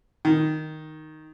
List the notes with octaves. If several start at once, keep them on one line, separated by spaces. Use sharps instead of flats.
D#3